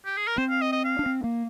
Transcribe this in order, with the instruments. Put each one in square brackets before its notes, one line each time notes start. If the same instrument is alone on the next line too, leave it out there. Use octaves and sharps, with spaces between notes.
[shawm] G4
G#4
A#4
[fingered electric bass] C4 [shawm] C5
[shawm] F5
D#5
D#5
F5
[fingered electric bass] D4
C4
A#3